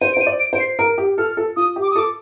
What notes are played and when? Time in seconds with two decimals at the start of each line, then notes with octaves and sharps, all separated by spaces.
0.01 C5 D#7
0.13 D7
0.17 C5 D#7
0.27 D5
0.40 D7
0.53 C5 D7
0.60 C7
0.79 A#4 D7
0.98 G4
1.18 A4 F6
1.37 A4
1.56 F4 D#6
1.76 G4
1.82 D6
1.91 D#6
1.95 A4
1.98 D6